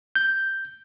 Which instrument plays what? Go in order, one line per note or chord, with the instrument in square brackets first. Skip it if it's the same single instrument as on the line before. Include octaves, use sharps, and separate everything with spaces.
[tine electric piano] G6